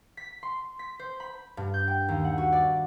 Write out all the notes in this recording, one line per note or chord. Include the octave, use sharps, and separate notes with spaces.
B6
C6
B6
C5
B5
G2
G6
G5
D#2
F#5
F#4
D5